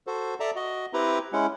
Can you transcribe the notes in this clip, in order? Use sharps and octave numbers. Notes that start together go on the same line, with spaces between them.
F#4 A4 C5
A4 D5 E5 A5 A#5
F#4 D#5
C4 E4 G4 B4 A#5
G#3 C#4 E4 F#5